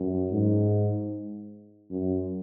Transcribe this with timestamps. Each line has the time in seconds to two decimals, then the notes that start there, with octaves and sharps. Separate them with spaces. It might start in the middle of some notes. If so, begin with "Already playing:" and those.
Already playing: F#2
0.31 G#2
1.90 F#2